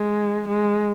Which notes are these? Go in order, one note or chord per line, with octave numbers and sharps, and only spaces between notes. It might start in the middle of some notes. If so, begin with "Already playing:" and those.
Already playing: G#3
G#3